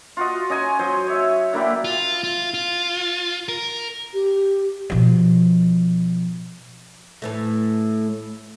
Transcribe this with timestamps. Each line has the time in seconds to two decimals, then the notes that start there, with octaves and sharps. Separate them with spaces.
0.17 F4 F#4 D#5
0.50 C#4 D#5 G#5 A#5
0.79 F#3 C5
1.07 C#5 E5
1.53 D3 A#3 E4 G4
1.84 F4
2.24 F4
2.54 F4
3.48 A#4
4.14 G4
4.90 B2 F3
7.22 A2 E3 A3